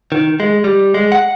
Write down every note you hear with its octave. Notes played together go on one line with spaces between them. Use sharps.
D#3
G#3
G3
G#3
F#5